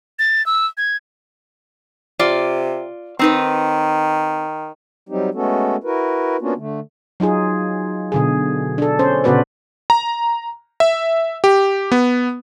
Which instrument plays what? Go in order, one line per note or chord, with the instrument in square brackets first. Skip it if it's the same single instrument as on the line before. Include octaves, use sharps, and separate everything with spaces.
[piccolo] A6
E6
G#6
[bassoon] C3 [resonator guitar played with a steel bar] F4 D5
[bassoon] D#3 [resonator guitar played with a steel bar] C4 D#4 B4
[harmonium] F#3 G3 C4 D#4 G4
G#3 A3 B3 C#4 F#4 A4
E4 F#4 A#4 B4
A#3 B3 C#4 D4 F4 F#4
D3 A3
[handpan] F#3 D#4 F4 G#4
B2 D3 G#4
D4 A4
C#4 C5
A#2 C#3 B3 F#4 B4 D5
[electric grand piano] A#5
E5
G4
B3